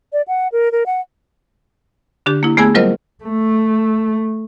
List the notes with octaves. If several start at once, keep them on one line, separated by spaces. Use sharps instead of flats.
D5
F#5
A#4
A#4
F#5
D3 D4 G4
A#3 E4
A3 B3 G#4 G#5 E6 G#6
F#3 G3 F4 A#4 C5 D#5
A3